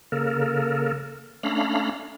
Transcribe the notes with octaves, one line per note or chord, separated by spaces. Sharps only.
C#3 A#3 A4 A#4
A3 C#4 D4 F5 A#5 B5